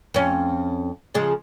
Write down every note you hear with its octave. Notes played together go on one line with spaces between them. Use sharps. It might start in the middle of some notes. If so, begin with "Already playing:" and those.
F2 C#4
C#3 F3 G#3